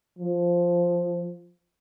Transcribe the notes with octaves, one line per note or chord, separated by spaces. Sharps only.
F3